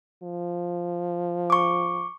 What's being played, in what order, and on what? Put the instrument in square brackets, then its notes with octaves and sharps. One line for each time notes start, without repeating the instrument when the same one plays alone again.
[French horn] F3
[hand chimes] C#6 D6